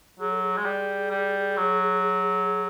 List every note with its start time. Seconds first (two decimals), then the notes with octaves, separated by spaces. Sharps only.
0.19 F#3 G#4
0.32 A4
0.43 G#4
0.57 G#3
0.65 G3
1.10 G3
1.57 F#3